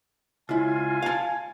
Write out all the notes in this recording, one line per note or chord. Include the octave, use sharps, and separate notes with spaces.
C#2 E4 F4 G#5
F5 A5